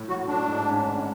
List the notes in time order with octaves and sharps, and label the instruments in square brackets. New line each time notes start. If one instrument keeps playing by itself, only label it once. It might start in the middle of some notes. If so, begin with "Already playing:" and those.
Already playing: [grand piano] A2
[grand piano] F#3 [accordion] F#4
[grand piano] A2 [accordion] D4
[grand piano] G#2
C#4
G#1